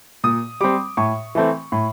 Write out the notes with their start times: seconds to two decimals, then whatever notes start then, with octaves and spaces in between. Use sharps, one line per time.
0.24 A#2 D#6
0.61 G3 C4 D6
0.97 A2 C#6
1.35 E3 A3 C4
1.72 A2